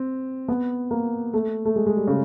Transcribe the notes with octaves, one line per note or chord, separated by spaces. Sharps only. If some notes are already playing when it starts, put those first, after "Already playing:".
Already playing: C4
B3
A#3
A3
A3
G#3
G#3
G3
C#3